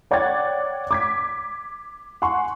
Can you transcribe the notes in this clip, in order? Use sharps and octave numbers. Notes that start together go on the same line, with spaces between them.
C#5 D5 F#5 G5 G#6 A6
D6 G#6 B6
F#5 G#5 C6 C#6